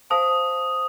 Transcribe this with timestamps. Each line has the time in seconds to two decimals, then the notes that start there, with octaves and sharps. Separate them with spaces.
0.10 C5 F5 A5 D#6